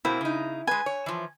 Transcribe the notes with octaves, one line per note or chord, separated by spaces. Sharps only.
B2 A#3 C4 E4
C#3 D#4
G#3 B4 G#5
C#5
E3 F3